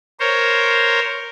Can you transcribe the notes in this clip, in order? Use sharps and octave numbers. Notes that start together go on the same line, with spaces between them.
A#4 C5 C#5